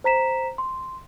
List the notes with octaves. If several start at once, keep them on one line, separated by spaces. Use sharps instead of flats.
C5 A#5 B6 E7
C6